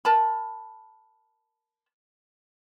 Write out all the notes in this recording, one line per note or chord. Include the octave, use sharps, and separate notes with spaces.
A#4 A5 B5